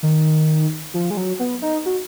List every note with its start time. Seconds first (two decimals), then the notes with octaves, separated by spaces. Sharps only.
0.03 D#3
0.94 F3
1.10 G#3
1.17 F#3
1.39 B3
1.62 D#4
1.86 F#4